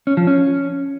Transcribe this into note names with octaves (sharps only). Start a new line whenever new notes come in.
C#4
F3
C#4